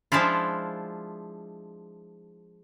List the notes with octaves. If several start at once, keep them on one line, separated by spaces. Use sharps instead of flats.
F3 G#3 D4 E4 F4